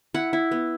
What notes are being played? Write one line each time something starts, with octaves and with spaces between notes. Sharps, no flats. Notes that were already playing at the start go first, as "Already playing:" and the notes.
E4 F#5
E4
B3